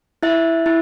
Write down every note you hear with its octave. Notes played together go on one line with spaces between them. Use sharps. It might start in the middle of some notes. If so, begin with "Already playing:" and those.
E4 E5
E4